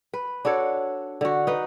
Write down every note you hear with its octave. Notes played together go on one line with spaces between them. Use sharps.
B4
D4 F#4 A4 C#5
D3 F#4
D#4 B4